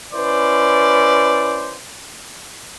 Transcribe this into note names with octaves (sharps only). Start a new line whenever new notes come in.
C#4 E4 B4 C5 D5